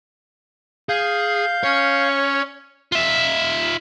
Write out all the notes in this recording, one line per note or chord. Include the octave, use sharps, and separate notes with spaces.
G#4 F5 G6
C#4 C#5
F4 E5